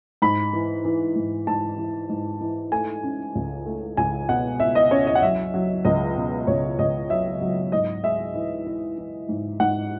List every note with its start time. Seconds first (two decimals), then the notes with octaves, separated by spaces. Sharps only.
0.22 G#2 B5
0.53 E3
0.85 E3
1.16 G#2
1.47 G#2 A5
1.78 E3
2.10 G#2
2.41 E3
2.72 A3 G#5
3.03 C#4
3.35 C#2
3.66 A3
3.97 C#2 G#5
4.29 B2 F#5
4.60 B2 E5
4.75 D#5
4.91 C#4 C#5
5.07 D#5
5.15 F#5
5.22 F#3 E5
5.54 F#3
5.85 C#2 D#5
6.16 B2
6.47 C#2 C#5
6.79 C#2 D#5
7.10 F#3 E5
7.41 F#3
7.72 G#2 D#5
8.04 G#3 E5
8.35 E3
8.66 E3
8.98 E3
9.29 G#2
9.60 G#2 F#5